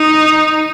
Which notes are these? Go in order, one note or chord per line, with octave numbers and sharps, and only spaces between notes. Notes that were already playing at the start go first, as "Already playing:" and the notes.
Already playing: D#4